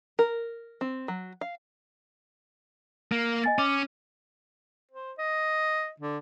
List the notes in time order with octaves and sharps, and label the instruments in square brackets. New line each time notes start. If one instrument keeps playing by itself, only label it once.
[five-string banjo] A#4
C4
F#3
F5
[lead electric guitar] A#3
[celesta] D#5 G#5 A6
[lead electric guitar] C#4 [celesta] D6
[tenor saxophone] C5
D#5
D3